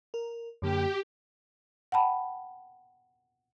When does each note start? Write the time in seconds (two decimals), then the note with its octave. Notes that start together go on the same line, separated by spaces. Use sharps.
0.14 A#4
0.62 F#2 D3 A#3 G4
1.92 F#5 G5 A5 B5